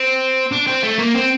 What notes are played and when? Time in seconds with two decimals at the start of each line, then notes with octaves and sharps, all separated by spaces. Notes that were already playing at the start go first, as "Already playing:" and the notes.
Already playing: C4
0.52 D4
0.67 C4
0.83 A3
0.99 A#3
1.15 C4